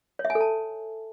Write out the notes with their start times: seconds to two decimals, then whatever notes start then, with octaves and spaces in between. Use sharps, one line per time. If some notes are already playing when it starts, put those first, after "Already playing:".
0.19 C#5
0.25 E5
0.30 G#5
0.35 A4
0.41 A5